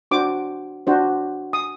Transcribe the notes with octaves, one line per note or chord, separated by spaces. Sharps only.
D4 F#4 C5 D6
D4 F#4 C5
D#6